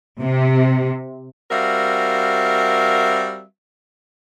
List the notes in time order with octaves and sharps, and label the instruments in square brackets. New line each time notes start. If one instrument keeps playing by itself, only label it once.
[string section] C3
[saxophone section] G3 C4 F#4 A#4 E5 F5